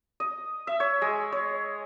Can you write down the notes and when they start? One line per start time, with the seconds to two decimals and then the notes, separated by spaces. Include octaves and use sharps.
0.20 D#5
0.67 E5
0.80 C#5
1.02 G#3
1.32 C#5